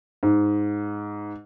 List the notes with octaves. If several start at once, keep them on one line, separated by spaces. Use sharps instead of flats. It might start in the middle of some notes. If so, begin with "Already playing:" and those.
G#2